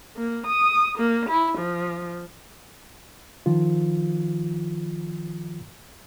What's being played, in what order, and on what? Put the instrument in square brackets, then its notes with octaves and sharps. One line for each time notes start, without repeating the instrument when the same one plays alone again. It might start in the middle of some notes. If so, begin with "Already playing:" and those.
[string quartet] A#3
D#6
A#3
E4
F3
[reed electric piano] D#3 F3 F4